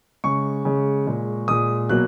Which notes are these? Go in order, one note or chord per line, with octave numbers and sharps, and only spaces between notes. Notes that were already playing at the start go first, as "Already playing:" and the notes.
C#3 G#3 C#6
C#3 G#3
A#2 G#3
A#2 G#3 D#6
B2 F#3 A#3 F#6